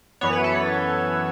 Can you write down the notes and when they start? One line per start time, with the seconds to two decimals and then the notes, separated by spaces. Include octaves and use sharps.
0.21 F#2 E3 B3 C#5
0.33 B4
0.44 A4
0.55 B4